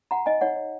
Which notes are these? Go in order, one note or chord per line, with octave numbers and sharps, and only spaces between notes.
F#4 F#5 A#5
D#4 D#5 G#5
D#4 C#5 F#5
C#5